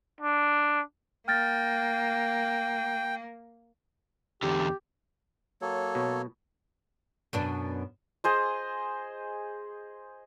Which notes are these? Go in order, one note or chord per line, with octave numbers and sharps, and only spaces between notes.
D4
A#3 G5 F6 A6 A#6
E2 D3 G4
F#3 A#3 A4 C#5
B2
F#2 B2 D4
G#4 C5 D#5